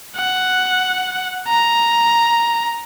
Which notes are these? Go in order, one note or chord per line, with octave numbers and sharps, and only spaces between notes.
F#5
A#5